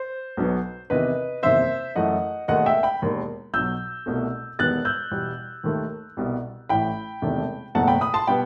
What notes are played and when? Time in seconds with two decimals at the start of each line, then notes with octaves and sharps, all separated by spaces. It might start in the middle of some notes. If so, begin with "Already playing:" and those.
Already playing: C5
0.37 B1 B2 F#3 B3
0.90 E2 C3 D#3 B4 D#5
1.43 F#1 E2 C3 D#3 C5 E5
1.96 F#2 E3 A3 D#5 F#5
2.48 E1 D#2 D#3 A3 D#5 F#5
2.66 E5 G5
2.83 G5 B5
3.02 E1 D#2 D#3
3.53 B1 B2 F#3 E6 G6
4.06 C2 B2 A3
4.59 E1 E2 D#3 G3 B3 F#6 A6
4.85 E6 G6
5.11 E2 B2 G3
5.64 D#2 D#3 A3
6.17 C2 B2 G3
6.69 A1 A2 E3 G5 B5
7.22 E1 E2 C3 D#3 A3
7.75 F#1 E2 B2 A3 F#5 A5
7.87 G5 B5
8.01 B5 D#6
8.14 A5 C6
8.27 B2 G3 B3 G5 B5